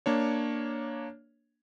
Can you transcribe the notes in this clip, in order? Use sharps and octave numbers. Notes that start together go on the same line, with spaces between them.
A#3 D4 C#5